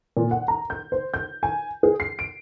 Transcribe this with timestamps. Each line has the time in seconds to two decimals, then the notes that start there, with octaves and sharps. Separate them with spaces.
0.17 A#2
0.31 F#5
0.48 A#5
0.70 G6
0.92 C5
1.14 G6
1.43 G#5
1.83 G#4
2.00 C7
2.19 D7